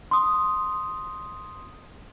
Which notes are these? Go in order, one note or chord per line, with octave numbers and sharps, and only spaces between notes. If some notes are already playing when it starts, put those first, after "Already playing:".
C6 D#6